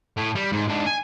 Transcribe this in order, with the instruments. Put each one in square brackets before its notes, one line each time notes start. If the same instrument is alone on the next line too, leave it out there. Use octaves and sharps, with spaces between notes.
[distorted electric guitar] A2
G3
G#2
G#2 D4
G#5